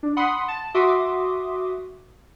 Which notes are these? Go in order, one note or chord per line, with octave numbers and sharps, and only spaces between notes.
D4
F#5 B5 C6 D#6
A5
F#4 E5 C6 D6 D#6